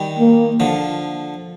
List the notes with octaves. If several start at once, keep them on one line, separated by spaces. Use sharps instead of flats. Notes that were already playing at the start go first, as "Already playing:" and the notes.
Already playing: D#3 G3
A#3
D3 F3